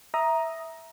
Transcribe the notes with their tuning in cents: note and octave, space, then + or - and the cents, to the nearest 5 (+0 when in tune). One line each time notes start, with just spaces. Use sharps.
E5 -5 A#5 +10 D#6 +0